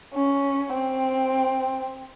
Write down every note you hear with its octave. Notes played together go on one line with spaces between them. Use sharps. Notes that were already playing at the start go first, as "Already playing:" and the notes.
C#4
C4